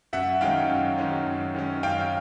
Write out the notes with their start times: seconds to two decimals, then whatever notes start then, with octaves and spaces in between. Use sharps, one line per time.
0.13 F#2 E5 F#5
0.41 D#3 G#3 C#4 F5 G5
0.69 F#2
0.98 D#3 G#3 C#4
1.27 F#2
1.55 D#3 G#3 C#4
1.83 F#2 F5 G5